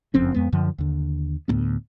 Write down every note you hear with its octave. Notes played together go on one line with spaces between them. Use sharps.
F#1 F2 C4 C#4
F2 G#3 B3
F#2 D3 F3
D#2 D3
D2 A2 A#3 B3